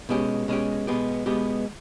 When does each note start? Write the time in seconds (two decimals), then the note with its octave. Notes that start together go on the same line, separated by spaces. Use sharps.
0.09 B2 G#3 C#4 G4
0.48 B2 G#3 C#4 G4
0.87 B2 G#3 B3 G4
1.26 B2 G#3 B3 G4